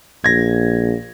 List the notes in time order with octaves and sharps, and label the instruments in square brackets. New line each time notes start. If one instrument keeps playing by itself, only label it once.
[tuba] A#1 [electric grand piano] G#6 A#6